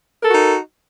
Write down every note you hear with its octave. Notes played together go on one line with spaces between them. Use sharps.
D#4 F#4 A4 A#4